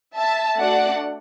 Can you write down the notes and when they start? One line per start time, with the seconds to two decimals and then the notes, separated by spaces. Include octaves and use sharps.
0.17 E5 A5
0.59 A3 D4 F#4 D5 F#5